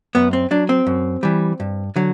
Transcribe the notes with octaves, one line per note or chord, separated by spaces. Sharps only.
F#2 B3
C4
F#3 D4
C4
F#2
E3 G3
G2
D3 F#3